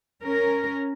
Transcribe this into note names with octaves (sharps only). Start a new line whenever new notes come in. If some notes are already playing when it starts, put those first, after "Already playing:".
C#4 A#4